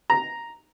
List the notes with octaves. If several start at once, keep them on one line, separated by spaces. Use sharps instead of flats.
A#5